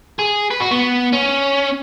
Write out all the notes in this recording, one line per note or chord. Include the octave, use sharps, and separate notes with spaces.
G#4
B4
F#4
B3
C#4